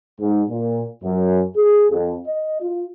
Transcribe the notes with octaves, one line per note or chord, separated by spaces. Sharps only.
G#2
A#2
F#2
G#4
F2
D#5
F4